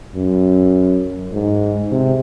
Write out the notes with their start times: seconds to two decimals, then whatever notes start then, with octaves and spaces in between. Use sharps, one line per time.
0.15 F#2
1.32 G#2
1.91 C3